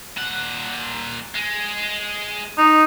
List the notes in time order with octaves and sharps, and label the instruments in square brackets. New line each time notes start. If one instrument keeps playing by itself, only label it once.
[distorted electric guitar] A#2 F#5
G#3
[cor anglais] D#4